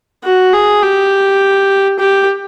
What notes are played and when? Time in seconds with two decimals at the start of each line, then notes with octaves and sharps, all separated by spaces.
0.24 F#4
0.53 G#4
0.82 G4
1.99 G4